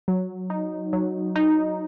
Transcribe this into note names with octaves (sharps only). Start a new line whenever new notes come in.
F#3
D#4
F#3
D#4